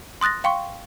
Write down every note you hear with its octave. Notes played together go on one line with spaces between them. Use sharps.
C6 D#6 F#6 A6 A#6
F5 G5 C6 C#6